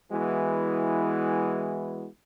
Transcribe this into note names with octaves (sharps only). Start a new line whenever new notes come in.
E3 G#3 B3 E4 F#4